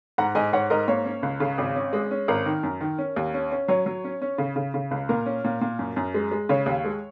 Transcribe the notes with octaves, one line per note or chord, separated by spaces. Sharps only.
G#2 F#5 A#5
G#2 D#5 G#5
G#2 C#5 F#5
G#2 A#4 D#5
A#3 C#5
C#4
C#2
C#3
G#1
C#4
G#3
C#4
G#1 A#4
D#3
F#2
D#3
C#4
D#2
C#4
C#4
F#3 C#5
F#3
C#4
C#4
C#3
C#3
C#3
C#2
A#2 A#4
C#4
A#2
A#2
F#2
F#2
G#3
G#3
C#3 C#5
D#2
G#3